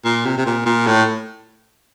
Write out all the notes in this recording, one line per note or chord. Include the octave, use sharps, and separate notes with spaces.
A#2
C3
C3
A#2
A#2
A2